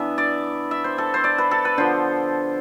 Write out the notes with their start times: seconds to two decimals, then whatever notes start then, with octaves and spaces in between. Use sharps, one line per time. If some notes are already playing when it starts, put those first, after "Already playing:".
Already playing: E3 B3 D4 E5
0.18 D5
0.71 E5
0.84 C5
0.98 A4
1.14 C5
1.24 D5
1.38 B4
1.51 A4
1.65 B4
1.78 D3 F3 B3 C5